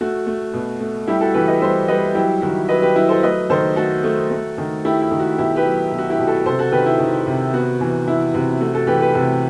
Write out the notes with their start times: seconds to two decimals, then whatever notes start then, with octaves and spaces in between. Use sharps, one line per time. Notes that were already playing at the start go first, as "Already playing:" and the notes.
0.01 A3 F#4
0.27 A3
0.54 B2
0.80 A3
1.08 G3 E4 G4
1.21 F#4 A4
1.34 E3 G4 B4
1.48 B4 D#5
1.61 G3 C5 E5
1.88 G3 B4 D#5
2.15 F#3 E4 G4
2.42 D#3 F#4
2.69 F#3 B4 D#5
2.82 G4 B4
2.96 F#3 E4
3.09 A4 C5
3.23 A3 B4 D#5
3.50 D#3 A4 C5
3.76 A3 F#4 A4
4.04 A3
4.31 A3
4.58 D#3
4.84 A3 E4 G4
5.02 E4
5.11 D#3
5.20 F#4
5.38 B2 E4 G4
5.56 G4 B4
5.66 F#3
5.91 B2
5.98 F#4
6.10 E4 G4
6.19 B2
6.27 F#4 A4
6.45 C3 A4 C5
6.59 F#4 A4
6.72 D#3 G4 B4
6.86 E4
6.99 D#3
7.27 C3
7.53 B3 F#4
7.81 E3
8.06 E3 E4
8.34 C3 F#4
8.61 A3 F#4
8.74 F#4 A4
8.87 E3 G4 B4
9.01 G4 B4
9.14 C3 F#4 A4